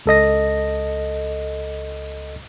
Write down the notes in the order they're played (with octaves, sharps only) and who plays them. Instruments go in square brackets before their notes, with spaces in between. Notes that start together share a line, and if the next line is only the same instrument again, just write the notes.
[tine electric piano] C#2 A4 D#5 A#6